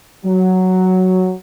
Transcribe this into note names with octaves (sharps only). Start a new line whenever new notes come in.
F#3